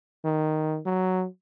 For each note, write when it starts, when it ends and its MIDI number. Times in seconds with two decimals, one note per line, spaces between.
0.24 0.79 51
0.86 1.26 54